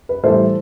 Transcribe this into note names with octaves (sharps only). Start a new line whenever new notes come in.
B4
A2 E3 G3 A4 C5